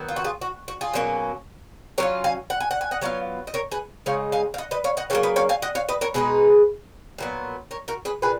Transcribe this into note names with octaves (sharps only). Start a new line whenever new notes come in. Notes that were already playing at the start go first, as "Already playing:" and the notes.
Already playing: D#3 F#3 B3
F4
F#4
F4 G#4
F#4
F#4
F4 G#4
B2 F#3 A#3 C#4
F#3 C#4 F4 A#4 C#5
F5 G#5
F#5
G#5
F#5
G#5
D#5 F#5
F#3 B3 F4 C#5 F5
D#5
A#4 C#5
G#4 B4
C#3 G#3 D#4 C#5 F5
F5 G#5
F5
D#5 F#5
B4 D#5
C#5 F5
D#5 F#5
C#3 F#3 A#3 C#5 F5
B4 D#5
C#5 F5
F5 G#5
D#5 F#5
C#5 F5
B4 D#5
A#4 C#5
B2 G#3 D#4 G#4 B4
A#2 F#3 B3
A#4 C#5
F#4 A#4
G#4 B4
A#2 G#4 B4